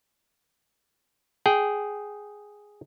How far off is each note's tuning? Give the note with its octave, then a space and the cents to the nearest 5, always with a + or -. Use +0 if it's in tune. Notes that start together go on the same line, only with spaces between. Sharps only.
G#4 +0 G5 -15